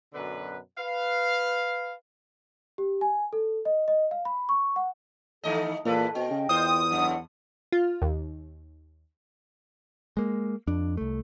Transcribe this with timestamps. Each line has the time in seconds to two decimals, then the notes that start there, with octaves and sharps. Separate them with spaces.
0.14 F#2 B2 D3 B4
0.78 B4 F5
2.78 G4
3.01 G#5
3.33 A4
3.65 D#5
3.88 D#5
4.11 F5
4.25 B5
4.49 C#6
4.76 F#5
5.44 D#3 A3 D#4 A4 D#5
5.85 E2 A#2 A4 B4 F5
6.15 B2 C4 D#5 G5
6.31 C#3
6.49 E2 F4 C5 D#6
6.91 F#2 A2 F#5
7.72 F4
8.02 D#2
10.17 G#3 A#3
10.67 F2 D4
10.97 C2 A3